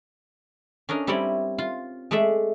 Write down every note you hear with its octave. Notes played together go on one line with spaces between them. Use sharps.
C#4 D4 A#4 D#5
G3 C4 E4 C#5 D5
F4
G#3 A3 D5 E5